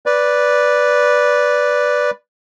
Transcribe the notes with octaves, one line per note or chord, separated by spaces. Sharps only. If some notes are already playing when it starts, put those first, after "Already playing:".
B4 D5